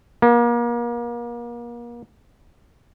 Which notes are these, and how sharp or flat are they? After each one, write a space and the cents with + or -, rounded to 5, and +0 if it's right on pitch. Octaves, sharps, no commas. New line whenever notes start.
A#3 +35